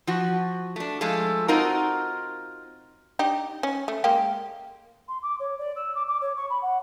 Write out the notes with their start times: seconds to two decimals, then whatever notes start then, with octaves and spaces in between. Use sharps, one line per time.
0.07 F3 F#4
0.76 A3 D4
1.01 F3 G#3 A3 F4 A4
1.48 C4 D#4 F4 F#4 A#4
3.19 D4 D#4 G4
3.63 C#4
3.88 A3
4.04 G#3 A#3 G4
5.08 C6
5.23 D6
5.40 C#5
5.59 D5
5.76 E6
5.95 D6
6.08 D6
6.21 C#5
6.36 C#6
6.50 B5
6.62 F#5